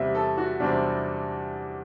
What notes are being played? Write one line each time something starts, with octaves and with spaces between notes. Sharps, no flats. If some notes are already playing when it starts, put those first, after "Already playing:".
Already playing: E2 C3 G3 C4 E5
A4
F#4
E2 C3 G3 C4 D4